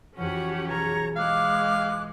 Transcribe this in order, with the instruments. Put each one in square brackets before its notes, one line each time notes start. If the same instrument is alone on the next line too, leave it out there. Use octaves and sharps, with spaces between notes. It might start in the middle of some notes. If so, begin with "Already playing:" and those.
[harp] F2 E3 F3 [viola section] C#4 F#4 G4 [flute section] F#5
[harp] B1 G#4 B4 [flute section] C#5 A#5 C#6
[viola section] G#3 [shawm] F5 [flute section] D6 F#6